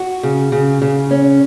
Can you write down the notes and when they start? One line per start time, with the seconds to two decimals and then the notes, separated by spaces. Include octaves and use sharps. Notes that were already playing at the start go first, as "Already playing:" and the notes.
Already playing: F#4
0.23 C#3
0.52 C#3
0.82 C#3
1.11 C#4